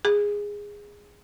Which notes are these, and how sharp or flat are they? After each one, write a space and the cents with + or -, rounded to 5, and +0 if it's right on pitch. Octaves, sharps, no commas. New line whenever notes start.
G#4 -15